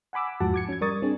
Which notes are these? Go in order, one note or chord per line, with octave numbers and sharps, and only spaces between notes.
F#5 G#5 B5 D6 E6
E2 G#2 F3 F#4 F#5 A5
D6 G#6 C#7
C#4 G#6
G3 A#4 D5 C#6 D#6 A6
C4 D4 G#4